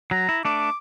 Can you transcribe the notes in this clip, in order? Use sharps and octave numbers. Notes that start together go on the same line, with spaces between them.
F#3 A#5
E4
A3 D4 D6